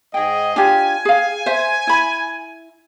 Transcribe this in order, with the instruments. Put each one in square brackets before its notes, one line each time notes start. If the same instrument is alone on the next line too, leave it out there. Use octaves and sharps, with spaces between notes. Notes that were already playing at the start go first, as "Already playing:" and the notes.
[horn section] G#2 G#4 D#5 [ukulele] G5
[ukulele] D4 F4 G4 [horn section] G#5
[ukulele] G#4 F5
C5 E5
E4 B5